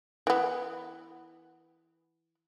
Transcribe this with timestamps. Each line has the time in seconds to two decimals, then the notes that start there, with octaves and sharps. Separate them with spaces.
0.27 E3 B3